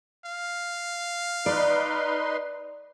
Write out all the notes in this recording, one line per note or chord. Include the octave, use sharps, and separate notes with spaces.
F5
D#4 B4 D5 C6